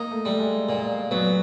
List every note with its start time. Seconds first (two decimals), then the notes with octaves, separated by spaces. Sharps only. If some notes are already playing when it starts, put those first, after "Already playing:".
Already playing: A#3 D#4
0.11 A3
0.25 G3 A3
0.39 G#3
0.69 A#2
1.11 F#3 B3